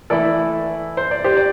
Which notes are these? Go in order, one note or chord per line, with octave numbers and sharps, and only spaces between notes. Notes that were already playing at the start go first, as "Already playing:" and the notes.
E3 A3 E4 A4 D5
C5
D5
G4 C5
D5